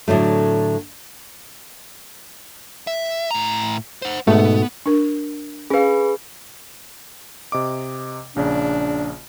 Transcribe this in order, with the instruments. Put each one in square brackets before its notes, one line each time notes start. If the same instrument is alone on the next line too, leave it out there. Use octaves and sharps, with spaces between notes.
[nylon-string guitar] A2 D3 F#3 A3
[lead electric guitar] E5
A2 A#5
C5 F#5
[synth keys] G#2 B2 A3 [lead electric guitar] B3
[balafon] D4 A#4
[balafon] C#4 F5 [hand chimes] G#4 B4
[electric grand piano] C3 D#5 D6
[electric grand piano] A#1 C#3 [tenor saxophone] D4